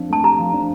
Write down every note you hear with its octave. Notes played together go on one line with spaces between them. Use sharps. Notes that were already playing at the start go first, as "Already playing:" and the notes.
Already playing: F3 C4 D4
A3 A5
G4 A#5
F3
D4